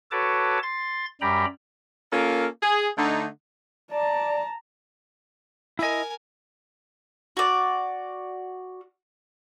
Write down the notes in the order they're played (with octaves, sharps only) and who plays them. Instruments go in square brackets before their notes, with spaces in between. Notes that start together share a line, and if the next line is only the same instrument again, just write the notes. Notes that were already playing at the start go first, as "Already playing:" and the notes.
[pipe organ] F#4 A4 B4 C#5 A5 D6
C6 A6
F#2 G3 G4 G5 A#5 B5
[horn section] A#3 C#4 F4 A4 A#4
G#4
D3 A3 D#4
[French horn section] D5 [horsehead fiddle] A5 A#5
[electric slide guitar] E4 D#5 [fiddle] A#4 G#5
[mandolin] F#4 D5